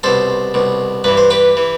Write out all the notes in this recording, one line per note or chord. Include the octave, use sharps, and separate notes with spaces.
C2 B2 A4 C5
C2 B2
G2 E3 B4
C5
G4 B4
E3